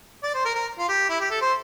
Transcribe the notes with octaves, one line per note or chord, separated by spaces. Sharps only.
D5
C5
A#4
A#4
F4
G4
E4
G4
A4
C5